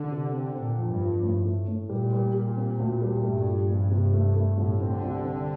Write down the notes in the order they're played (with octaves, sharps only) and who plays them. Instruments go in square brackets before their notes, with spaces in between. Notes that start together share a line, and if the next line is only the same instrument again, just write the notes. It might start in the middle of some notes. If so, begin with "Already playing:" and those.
Already playing: [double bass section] D3
[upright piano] C3
C4
[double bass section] A#2 [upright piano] C4
[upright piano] F2
[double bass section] G2
[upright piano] F3
A2
A3
A2
[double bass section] A#2 [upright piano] G3
[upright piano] G3
G3
C4
D2
G3
[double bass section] G2 [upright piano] A3
[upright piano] A#2
A#1
C3
A3
A3
[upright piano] C2 [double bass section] A2
[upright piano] C4
[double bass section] D3
[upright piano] C2
C4